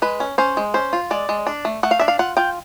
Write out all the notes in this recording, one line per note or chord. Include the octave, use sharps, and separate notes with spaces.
G#3 B4
C#4
C#4 C5
G#3
C#4 C5
F4
G#3 D5
G#3
D4
A3
A3 F#5
F5
D4 E5
F5
F4 F#5
F4 G5